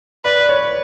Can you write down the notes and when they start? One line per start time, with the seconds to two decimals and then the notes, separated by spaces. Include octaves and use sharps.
0.25 B4 D5
0.49 C#5